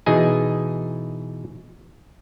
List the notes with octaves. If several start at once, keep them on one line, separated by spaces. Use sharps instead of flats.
B2 E3 D#4 G#4 G#5